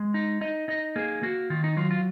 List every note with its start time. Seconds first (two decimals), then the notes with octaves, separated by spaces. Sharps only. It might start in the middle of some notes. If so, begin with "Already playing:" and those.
Already playing: G#3
0.14 D#4
0.41 D#4 D#5
0.68 D#4 D#5
0.96 A#3 G#4
1.23 A#3 F#4
1.50 D#3 F4
1.64 D#4
1.77 F#3 F4
1.91 F4